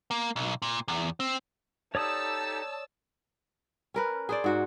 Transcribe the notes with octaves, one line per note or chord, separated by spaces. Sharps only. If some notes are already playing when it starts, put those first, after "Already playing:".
A#3
B1
A#2
E2
C4
D#4 G4 A4 C#5 D5 A5 D#6 E6
C#4 A#4 B4
G#4 C5 D5
G#2 F#4 C5